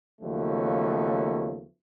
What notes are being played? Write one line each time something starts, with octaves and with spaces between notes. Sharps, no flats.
D#2 C#3 F3 F#3 A3 B3